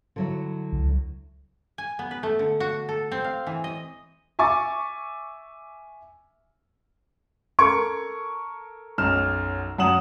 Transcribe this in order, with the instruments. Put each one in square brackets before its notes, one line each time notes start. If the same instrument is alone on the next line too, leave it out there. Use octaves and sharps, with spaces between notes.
[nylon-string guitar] D3 F#3 E4
[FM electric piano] C#2
[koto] G#5
B3
B4
A3
D3
F#4
A4
C4
F5
E3
D#5
[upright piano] E5 G#5 C#6 D6 A6
[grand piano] A4 A#4 C#6 G#6 C#7 D7
B1 F#2 F6 E7
F#2 F#3 F#5 D#6 E7 F#7